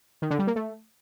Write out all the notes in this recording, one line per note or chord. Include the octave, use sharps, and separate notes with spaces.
D#3
D3
G3
A#3
A3